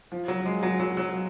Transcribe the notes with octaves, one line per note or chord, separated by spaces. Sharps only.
F3
F#3
G#3
F#3
F#3
F#3